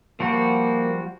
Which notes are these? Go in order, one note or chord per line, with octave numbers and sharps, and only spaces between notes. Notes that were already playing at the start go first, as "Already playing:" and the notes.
F3 G3 A#3 F#4